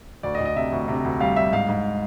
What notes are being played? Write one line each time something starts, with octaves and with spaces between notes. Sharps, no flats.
D2 D5
D#5
D2
D#5
C3 E5
D2
C3
D2
G3 F5
G3 E5
G#2 F5
G#2